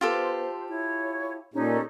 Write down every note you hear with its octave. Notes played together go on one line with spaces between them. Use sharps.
B3 F4 G4 A4 C5
E4 C#5
A#2 C#4 D#4 G4 A4